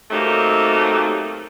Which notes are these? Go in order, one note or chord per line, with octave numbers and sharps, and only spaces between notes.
F#3 A3 A#3 C4 D#4 G4